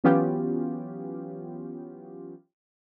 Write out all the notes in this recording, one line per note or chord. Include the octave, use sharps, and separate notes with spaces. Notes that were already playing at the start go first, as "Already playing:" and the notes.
E3 F#3 B3 C#4 F4 G4